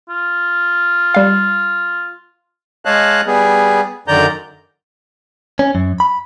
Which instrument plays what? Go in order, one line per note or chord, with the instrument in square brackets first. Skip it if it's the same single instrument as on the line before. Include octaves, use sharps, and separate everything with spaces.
[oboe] F4
[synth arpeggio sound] G3 F5
[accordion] G#3 C#5 D#5 F5 A5 F#6
G3 B3 G#4
F#2 D3 D#3 D5 A#5 G6
[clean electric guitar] C#4
F#2
B5